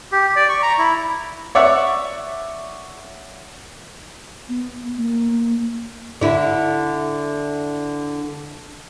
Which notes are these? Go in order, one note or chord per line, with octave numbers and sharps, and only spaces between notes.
G4
D5
C#6
A#5
E4
C#5 D5 E5 F#5
B3
A#3
D3 E4